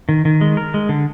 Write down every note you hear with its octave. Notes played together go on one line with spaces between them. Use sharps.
D#3
D#3
G#3
A#4
G#3
D3